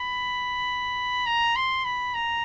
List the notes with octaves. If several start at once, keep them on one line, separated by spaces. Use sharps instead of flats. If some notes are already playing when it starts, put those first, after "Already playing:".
Already playing: B5
A#5
C6
B5
A#5